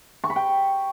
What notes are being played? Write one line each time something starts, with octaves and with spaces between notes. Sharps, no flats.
C#6
B5
G5